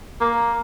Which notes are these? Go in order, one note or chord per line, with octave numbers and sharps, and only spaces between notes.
A#3